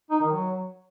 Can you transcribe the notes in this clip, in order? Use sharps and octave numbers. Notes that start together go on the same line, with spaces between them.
D#4
D#3
F#3